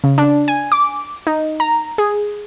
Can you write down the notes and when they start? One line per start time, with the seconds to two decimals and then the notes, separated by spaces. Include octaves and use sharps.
0.04 C#3
0.18 D4
0.48 G#5
0.72 D6
1.27 D#4
1.60 A#5
1.98 G#4